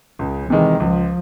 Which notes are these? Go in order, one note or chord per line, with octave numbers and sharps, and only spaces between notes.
C#2 C#3
C3 D#3 E3 G#3
C#2 F3